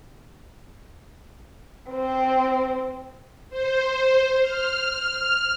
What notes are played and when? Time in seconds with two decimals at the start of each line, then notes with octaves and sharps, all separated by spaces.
1.90 C4 C5
3.50 C5
4.41 F6